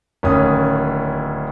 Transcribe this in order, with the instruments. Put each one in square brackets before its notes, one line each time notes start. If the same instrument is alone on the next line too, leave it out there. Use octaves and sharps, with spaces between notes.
[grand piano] D1 D#2 C#4 D#6